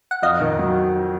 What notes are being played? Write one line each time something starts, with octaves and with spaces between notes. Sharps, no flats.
F#5
F2 D#5 F5
D#3
F#3